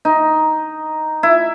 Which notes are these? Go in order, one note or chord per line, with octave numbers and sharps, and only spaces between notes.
D#4
E4